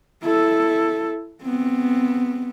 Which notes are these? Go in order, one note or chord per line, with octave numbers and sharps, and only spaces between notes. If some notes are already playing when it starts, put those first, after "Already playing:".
E4 A4
B3 C4